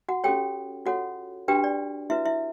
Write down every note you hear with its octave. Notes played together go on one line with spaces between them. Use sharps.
F#4 F#5
C#4 F#4 G4 A4 C#5 G5
F4 F#4 A4 C#5 F#5
D4 F#4 G4 B4 G5
D5
E4 F#4 B4 E5
E4 E5